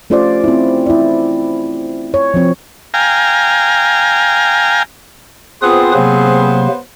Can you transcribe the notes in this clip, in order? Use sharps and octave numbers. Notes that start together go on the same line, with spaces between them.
A3 C#4 F4 G4 C5 D5
C4 E4
E4 D5
C#5
F3 C4
F5 G5 G#5 A#5
B3 C4 F4 G#4 B4 C5 D#6
C3 F#3 A#3